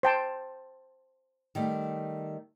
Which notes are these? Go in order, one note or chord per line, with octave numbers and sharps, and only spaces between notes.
C5 G5 A5
D#3 G3 A3